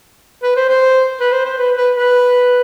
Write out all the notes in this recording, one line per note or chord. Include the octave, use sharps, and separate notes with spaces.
B4
C5
C5
B4
C5
C5
B4
B4
B4